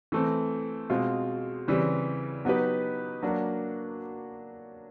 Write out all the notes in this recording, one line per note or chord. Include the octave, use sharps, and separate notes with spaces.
E3 A3 C4
B2 G#3 C4 F4
C#3 E3 G3 C4
F#3 B3 D#4 G4 B4
F#3 A#3 D4 F#4